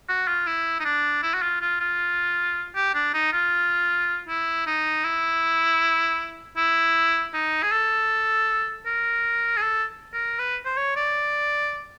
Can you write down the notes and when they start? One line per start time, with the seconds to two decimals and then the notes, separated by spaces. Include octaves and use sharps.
0.09 F#4
0.28 F4
0.47 E4
0.80 D#4
0.85 D4
1.23 E4
1.34 F#4
1.42 F4
1.61 F4
1.80 F4
2.76 G4
2.95 D4
3.14 D#4
3.33 F4
4.28 E4
4.67 D#4
5.04 E4
6.57 E4
7.34 D#4
7.63 G#4
7.71 A4
8.86 A#4
9.57 G#4
9.62 A4
10.13 A#4
10.39 B4
10.65 C5
10.77 C#5
10.96 D5